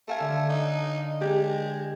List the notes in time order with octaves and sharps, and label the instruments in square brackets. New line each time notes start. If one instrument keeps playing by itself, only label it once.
[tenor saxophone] A3 [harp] A4 F5 G#5
[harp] D3
[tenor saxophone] D#4
[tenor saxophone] G#3 [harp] G4